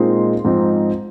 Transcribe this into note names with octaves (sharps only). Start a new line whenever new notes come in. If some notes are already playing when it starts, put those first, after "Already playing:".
Already playing: A#2 G#3 C4 D#4 C6
G#2 F3 C4 D#4